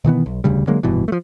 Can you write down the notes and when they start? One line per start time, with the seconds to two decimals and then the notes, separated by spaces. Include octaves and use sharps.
0.04 B2 D#3 E3 B3
0.26 B1
0.44 E1 D2 C#3 G3
0.67 D3 F#3 G#3 A#3
0.83 F1 G2 B2 E3
1.08 F3 A3